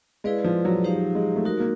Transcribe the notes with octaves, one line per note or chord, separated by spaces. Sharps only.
G#3 E4 G#4 B4 D5 F5
F3
F#3
D#4 G4 C5 F5
G#3
A3
G#3 D#4 F#4 A#4
A#3